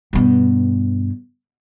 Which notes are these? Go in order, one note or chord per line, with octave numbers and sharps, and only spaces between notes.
G2 B2